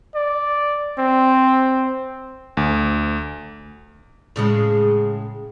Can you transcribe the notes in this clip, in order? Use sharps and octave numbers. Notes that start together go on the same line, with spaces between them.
D5
C4
D2
A2 C#3 G#3